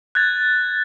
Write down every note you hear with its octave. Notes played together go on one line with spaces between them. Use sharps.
F#6 G#6 A6